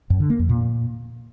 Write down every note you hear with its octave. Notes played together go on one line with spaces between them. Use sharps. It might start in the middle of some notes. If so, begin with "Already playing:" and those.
F#2
D3
A#3
F2
A#2